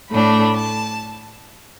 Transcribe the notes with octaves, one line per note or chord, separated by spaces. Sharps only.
A2 A3 D4 B5
A5